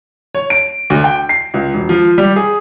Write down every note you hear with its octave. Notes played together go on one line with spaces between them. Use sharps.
C#5
D7
D2
G5
C7
C#2
E1
F3
G3
G#4